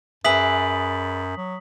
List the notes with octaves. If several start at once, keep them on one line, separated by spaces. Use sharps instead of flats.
F#2 G#4 B4 D5 E5 D#6 B6 F#7
F#3